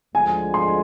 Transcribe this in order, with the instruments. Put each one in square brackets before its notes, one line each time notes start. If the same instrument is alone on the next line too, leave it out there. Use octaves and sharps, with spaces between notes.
[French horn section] D2 D3 F3 G#3 [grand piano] G#5
[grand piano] C6